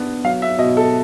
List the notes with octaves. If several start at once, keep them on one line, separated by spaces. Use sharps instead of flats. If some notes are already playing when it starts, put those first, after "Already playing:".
Already playing: B3 D4
F#3 F5
E5
B2 D#5
A4